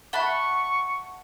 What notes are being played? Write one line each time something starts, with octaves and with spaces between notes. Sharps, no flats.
E5 F#5 A5 B5 C#6 F#6 G7